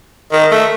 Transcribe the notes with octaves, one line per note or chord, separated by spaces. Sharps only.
D#3
A3